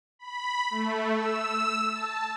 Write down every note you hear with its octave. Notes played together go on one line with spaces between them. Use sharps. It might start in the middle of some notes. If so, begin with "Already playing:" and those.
B5
A3
E6
A5